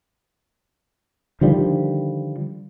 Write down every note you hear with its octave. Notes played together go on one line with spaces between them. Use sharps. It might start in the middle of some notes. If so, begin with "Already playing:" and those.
D3 D#3 F3 G3